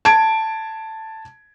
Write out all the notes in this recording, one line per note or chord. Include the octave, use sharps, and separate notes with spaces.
A5 G#6 D7